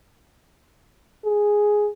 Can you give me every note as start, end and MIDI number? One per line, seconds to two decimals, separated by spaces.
1.25 1.90 68